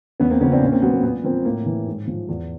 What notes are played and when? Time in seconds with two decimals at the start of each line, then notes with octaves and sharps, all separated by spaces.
0.20 E2 B3 C#4
0.30 A#3 C4
0.40 C#3 F3 B3 C#4
0.52 C4 D4
0.62 A#2 C#4
0.72 A#3 C4
0.82 F#3 B3
0.93 A#3
1.03 A#2 B3
1.24 F3 A#3 C4
1.45 A2 A#3
1.66 E3
1.87 G#2
2.08 F3
2.29 E2